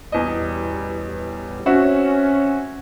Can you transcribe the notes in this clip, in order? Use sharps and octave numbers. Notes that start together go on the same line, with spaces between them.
A1 E2 B2 G3 D#5
C4 C#4 F#4 E5